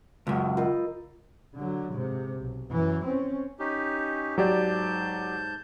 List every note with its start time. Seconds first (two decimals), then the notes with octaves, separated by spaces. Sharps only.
0.27 C#2 F#2
0.57 F4 A#4 D#5
1.55 D3 F#3
1.92 G#2 C3
2.40 B1
2.71 F#2 E3
3.04 C4 C#4
3.59 C#4 D#4 G4
4.38 G#2 F#3 G4 D5 A5 G6